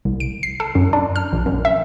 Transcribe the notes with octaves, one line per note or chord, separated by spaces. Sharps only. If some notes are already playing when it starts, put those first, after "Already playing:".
C2
D7
C7
A4
F#2
D4
F6
A#1
F#2
E5